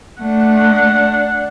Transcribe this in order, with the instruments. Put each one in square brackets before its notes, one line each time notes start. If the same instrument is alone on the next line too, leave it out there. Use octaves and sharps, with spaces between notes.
[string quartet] A3 [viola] D4 F#5